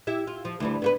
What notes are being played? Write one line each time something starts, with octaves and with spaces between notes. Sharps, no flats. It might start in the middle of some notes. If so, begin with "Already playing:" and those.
E4 G4 E5
F4
F3
D2 E3 G3
B3 F#4 B4